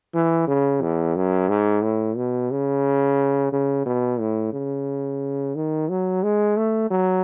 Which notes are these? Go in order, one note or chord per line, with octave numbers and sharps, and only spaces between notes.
E3
C#3
E2
F#2
G#2
A2
B2
C#3
C#3
B2
A2
C#3
D#3
F#3
G#3
A3
F#3